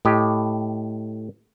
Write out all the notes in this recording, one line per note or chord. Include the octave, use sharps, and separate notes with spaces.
A2 G4 D#5